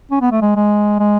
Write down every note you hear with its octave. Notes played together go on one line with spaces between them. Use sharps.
C#4
B3
A3
G#3
G#3
G#3